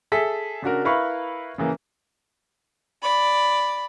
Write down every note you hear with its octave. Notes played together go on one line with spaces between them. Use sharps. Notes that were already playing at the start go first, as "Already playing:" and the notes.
G#4 A4 E5 B6
C#3 D4 F#4 A#4
E4 A#4 B4 F5 B5 C#6
C#3 E3 A#3
D5 B5